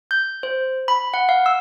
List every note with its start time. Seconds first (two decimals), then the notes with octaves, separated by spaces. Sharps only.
0.11 G6
0.43 C5
0.88 B5
1.14 F#5
1.29 F5
1.46 E6